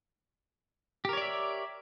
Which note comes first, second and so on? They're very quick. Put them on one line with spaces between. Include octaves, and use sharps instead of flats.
G4 A#4 C#5 D5 E5